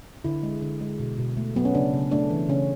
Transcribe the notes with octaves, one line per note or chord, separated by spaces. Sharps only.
D3 E4
G#3
D3
G#3
B2
B2
A3
F#3 B3
C#4
C#3 D4
C#3
A3 D4
E3
C#3 C#4